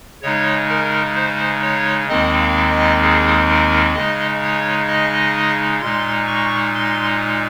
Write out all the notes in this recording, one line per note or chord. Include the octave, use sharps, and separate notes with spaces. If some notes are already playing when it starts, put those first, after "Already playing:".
C#3 G#3 D#4 C#5
A#4
C5
C#5
D#2 D#3 G#3 C4 D#4 D#5
F5
D#5
G#4
A#4
C#3 G#3 D#4 D#5
C#5
D#5
A#2 G#3 D#4 C6
C#6
C6